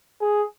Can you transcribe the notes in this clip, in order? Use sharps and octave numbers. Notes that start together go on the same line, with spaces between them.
G#4